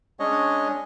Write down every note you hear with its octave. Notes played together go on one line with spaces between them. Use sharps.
G#3 C#4 D4 C#5 D#5